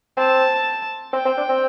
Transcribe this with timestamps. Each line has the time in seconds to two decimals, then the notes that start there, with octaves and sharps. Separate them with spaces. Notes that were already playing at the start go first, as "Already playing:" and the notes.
0.17 C4 A5
1.13 C4 G5
1.25 C4
1.37 D4
1.49 C4